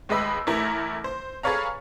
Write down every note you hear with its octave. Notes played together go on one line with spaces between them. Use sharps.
D#2 G#3 B4 D#5 B5 E6
A1 A3 E4 A#4 A#5 A#6
C5
G#4 A4 B4 C#5 F5 A#5